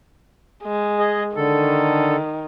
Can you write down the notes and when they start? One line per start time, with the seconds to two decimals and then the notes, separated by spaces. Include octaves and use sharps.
0.64 G#3
0.99 G#4 D#5
1.36 D3 D#3 A4